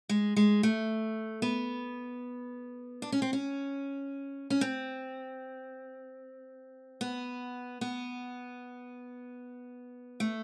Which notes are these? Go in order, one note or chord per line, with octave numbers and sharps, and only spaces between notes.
G#3
G#3
A3
B3
D4
C#4
C4
C#4
C#4
C4
B3
B3
A3